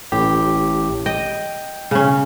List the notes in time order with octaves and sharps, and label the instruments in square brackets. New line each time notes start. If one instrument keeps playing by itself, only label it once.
[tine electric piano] A1 A2 G4
[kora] D#5 [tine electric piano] G5
[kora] C#3 C#4